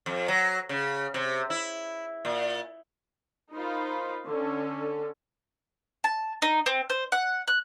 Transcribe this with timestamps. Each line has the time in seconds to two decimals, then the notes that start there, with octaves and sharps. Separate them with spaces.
0.06 F2
0.28 F#3
0.69 C#3
1.14 C3
1.50 E4
2.25 A#2
3.53 D#4 F4 A#4 C5 B5
4.26 D3 C#4 A4
6.04 A5
6.42 D#4
6.66 C4
6.90 C5
7.12 F#5
7.48 F#6